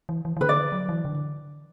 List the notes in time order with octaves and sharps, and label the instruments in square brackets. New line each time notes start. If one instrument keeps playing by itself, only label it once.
[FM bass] E3
E3
E3
[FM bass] D3 [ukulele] B4
[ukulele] D5
[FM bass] F#3
E3
D3